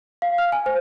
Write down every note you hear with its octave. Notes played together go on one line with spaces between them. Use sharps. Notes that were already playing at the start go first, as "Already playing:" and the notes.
F5
F6
G#5
C5